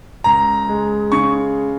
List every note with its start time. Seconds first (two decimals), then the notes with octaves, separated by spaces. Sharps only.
0.24 C#2 A#5
0.68 G#3
1.12 C#3 C#6